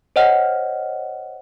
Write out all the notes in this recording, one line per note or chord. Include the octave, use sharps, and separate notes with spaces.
C5 C#5 D#5 F#5 F6